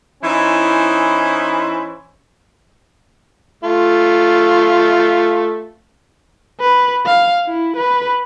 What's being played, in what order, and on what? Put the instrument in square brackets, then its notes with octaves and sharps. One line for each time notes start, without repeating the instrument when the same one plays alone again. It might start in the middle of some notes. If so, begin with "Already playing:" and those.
[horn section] E3 C#4 D#4 E4 C5
[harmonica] A3 F4
[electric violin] B4
F5
E4
B4